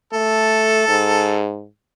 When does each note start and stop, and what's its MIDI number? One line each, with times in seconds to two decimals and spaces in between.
0.13 0.88 57
0.13 1.38 69
0.88 1.66 44